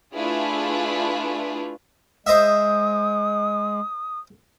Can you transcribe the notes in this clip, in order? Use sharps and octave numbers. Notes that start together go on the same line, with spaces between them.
A3 D4 E4 F4 G#4 B4
G#3 C5 D#5 E5 D#6